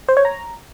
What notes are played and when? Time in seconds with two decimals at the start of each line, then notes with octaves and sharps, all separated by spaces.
0.09 C5
0.17 C#5
0.25 A#5